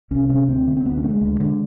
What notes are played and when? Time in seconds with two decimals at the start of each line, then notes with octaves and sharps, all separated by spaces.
0.11 C2 C#4
0.29 C3 C#4
0.49 D2 C4
0.67 D3
0.77 C4
0.85 D2 B3
0.98 C#4
1.04 D3 A3
1.10 G#3
1.21 D2
1.40 D3